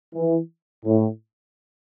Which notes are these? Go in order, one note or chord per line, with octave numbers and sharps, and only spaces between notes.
E3
A2